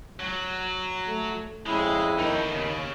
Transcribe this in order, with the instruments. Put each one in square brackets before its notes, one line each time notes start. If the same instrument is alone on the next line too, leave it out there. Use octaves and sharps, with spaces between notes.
[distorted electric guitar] F#3
[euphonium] A3
[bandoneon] F2 E4 [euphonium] C#3 [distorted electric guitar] G#3
[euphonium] D#3 [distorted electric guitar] D#4 C#5
[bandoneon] D#2 [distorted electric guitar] C#3